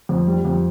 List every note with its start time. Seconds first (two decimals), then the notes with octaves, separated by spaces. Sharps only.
0.09 F2
0.27 G3
0.45 F2